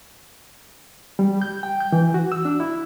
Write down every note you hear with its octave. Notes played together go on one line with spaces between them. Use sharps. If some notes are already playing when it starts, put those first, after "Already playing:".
G3
G6
G5
G6
E3
F#4
E6
D4
E4